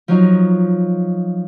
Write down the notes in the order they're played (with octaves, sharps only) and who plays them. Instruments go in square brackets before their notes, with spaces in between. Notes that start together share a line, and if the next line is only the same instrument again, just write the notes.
[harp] F3 F#3 D#4